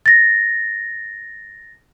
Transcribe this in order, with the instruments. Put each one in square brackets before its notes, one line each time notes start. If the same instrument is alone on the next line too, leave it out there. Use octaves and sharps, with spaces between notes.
[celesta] A6 A#6